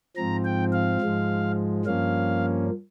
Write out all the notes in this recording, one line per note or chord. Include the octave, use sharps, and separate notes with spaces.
G#2 F3 C4 A#5
G5
F5
G#2 F3 G#3
G2 F3 A#3 C#4 F5